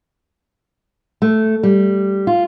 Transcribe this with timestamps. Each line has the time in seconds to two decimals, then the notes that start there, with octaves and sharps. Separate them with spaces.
1.22 A3
1.63 G3
2.27 F4